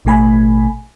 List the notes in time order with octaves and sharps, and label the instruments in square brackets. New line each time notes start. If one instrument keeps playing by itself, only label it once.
[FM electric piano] A1 B2 A3 G#5 B5